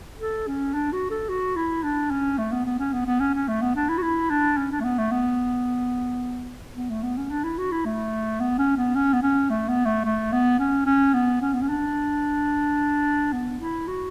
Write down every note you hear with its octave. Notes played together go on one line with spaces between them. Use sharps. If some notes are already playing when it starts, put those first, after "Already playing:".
A4
C#4
D4
F#4
A4
F#4
E4
D4
C#4
A3
B3
B3
C#4
B3
B3
C#4
C#4
A3
B3
D4
E4
F#4
E4
D4
C#4
D4
A3
B3
A3
B3
B3
A3
B3
C#4
D4
E4
F#4
E4
A3
B3
C#4
B3
C#4
B3
C#4
A3
B3
A3
A3
B3
C#4
C#4
B3
C#4
B3
C#4
D4
B3
E4
F#4